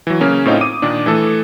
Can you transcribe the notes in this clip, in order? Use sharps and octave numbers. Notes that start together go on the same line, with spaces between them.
E3 F#3
C#3 A#3 C#4
A2 C4 C#4 D#4 F4
D6 D#6 D#7
A#2 D#3 D4
E3 A3 A4